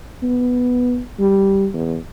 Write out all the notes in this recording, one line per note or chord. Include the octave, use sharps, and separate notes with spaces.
B3
G3
E2